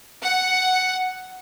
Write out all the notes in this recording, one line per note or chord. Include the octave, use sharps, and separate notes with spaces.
F#5